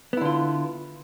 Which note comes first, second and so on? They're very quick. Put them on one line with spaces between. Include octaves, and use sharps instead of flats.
B3 E4 D3 F4